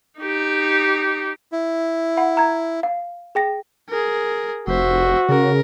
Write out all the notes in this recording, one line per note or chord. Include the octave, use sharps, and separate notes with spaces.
D#4 G4
E4
F#5 B5
A#5 G#6
F5
G#4 G5 A#6
G#4 A#4
F1 F#4 C5 E5
C#3 A#4